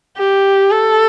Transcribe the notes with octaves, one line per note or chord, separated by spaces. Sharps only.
G4
A4